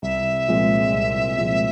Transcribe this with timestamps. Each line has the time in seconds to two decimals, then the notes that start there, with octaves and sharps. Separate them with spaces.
0.02 C2 E5
0.48 A#2 F3 G#3 C4
0.93 C2
1.38 A#2 F3 G#3 C4